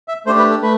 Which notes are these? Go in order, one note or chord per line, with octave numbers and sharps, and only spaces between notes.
E5
A3 D4 G4 C5
B4
A4
A3 B4